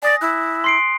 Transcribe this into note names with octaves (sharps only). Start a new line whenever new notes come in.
D5 G#5 D#6 A#6
E4 F#6
C6 C7 D7